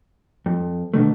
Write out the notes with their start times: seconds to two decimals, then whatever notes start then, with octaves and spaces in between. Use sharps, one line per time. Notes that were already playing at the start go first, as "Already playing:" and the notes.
0.46 F2
0.94 B2 D3 D#3 A3